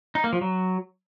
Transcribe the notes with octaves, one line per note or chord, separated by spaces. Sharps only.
D#4
A#3
F3
F#3